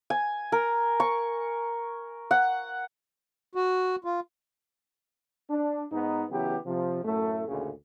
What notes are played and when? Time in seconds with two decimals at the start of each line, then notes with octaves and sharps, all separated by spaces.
0.10 G#5
0.52 A#4
1.00 C#6
2.31 F#5
3.55 F#4
4.04 F4
5.49 D4
5.92 G#2 B3 D#4
6.31 C#3 E3 F#3 B3 G4
6.66 C3 F3
7.03 F#2 A2 A3
7.48 A1 D2 A#2 C#3